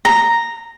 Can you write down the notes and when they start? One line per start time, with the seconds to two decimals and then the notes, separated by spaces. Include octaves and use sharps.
0.05 A#5